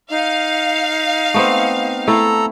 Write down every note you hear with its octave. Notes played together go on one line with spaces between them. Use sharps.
D#4 F5
A3 B3 C4
A3 E4 A4 A#5